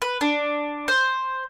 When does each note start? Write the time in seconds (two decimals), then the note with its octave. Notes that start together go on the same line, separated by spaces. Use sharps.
0.02 B4
0.21 D4
0.88 C5